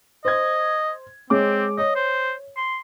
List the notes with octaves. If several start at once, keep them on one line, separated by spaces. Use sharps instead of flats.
C5 D#5 G#6
G#3 C4 C#5 D6
C#5 D#5
C5
C6